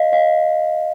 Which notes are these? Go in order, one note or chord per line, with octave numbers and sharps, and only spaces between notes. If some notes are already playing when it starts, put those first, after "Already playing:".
Already playing: D#5 F5
D#5 F5